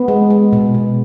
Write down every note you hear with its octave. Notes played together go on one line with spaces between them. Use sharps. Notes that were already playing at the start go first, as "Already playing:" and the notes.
Already playing: B3
G#3
G#3
B2
B2